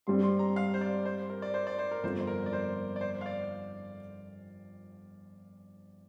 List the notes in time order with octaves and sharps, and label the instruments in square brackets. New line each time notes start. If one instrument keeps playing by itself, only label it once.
[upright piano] G2 G3 C4 [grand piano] C6
[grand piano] C6
A#5
F5
C5
D5
C5
A#4
D5
C5
D5
C5
A#4
[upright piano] G1 F2 F3 C4 F4 [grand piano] C5
[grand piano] A#4
D5
C5
D5
C5
F5
D5